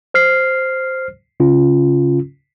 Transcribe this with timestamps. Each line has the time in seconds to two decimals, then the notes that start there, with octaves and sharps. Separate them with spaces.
0.14 C5 F6 C7
1.40 C#3 C#4 F4